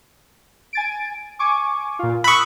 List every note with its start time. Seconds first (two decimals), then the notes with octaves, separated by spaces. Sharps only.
0.73 G#5 A6 D7
1.39 G#5 C#6 D6
1.99 A#2 F4
2.24 B5 C#6 D#6 E6 F#6